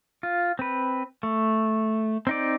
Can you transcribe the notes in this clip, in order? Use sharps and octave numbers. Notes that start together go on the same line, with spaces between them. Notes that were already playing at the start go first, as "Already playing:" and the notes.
F4
C4 B4
A3
C4 D#4 D5